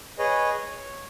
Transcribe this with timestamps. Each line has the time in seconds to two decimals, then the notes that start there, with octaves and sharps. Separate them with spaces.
0.19 G#4 B4 C#5 D#5
0.59 C#5